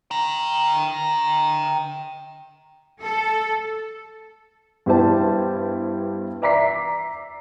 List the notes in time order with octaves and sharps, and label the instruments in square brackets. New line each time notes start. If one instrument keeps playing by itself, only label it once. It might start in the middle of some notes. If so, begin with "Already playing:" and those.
[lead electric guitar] G5 A#5
[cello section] A4
[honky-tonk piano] G2 B3 E4 G4 C5 A5
D5 E5 A#5 D6 B6 C7